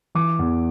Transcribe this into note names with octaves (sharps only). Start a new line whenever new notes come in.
E3 D6
E2